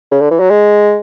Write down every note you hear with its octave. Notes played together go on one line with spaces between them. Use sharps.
C#3
D3
E3
F#3
G#3